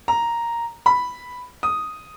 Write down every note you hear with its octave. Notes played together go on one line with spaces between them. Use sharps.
A#5
B5
D#6